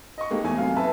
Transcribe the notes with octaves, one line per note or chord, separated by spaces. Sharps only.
D#5 C#6
G#3 A#3 D#4 G4 A4
E2 E3 A3 G#5
F#2 C3 F5
B4 E5 A5